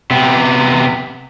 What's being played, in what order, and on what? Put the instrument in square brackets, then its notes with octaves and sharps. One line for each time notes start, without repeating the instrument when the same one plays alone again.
[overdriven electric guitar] C3 B3